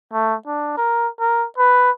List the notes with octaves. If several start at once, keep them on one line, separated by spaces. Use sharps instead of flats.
A3
D4
A#4
A#4
B4